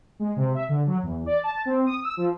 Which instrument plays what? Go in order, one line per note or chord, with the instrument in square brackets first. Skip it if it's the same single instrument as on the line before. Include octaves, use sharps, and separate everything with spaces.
[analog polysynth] G#3
C3
E5
D3
F#3
E2
D5
A5
C4
D#6
E6
F3